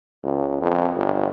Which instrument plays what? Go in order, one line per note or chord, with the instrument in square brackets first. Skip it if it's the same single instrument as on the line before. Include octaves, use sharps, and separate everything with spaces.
[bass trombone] C#2
F2
G1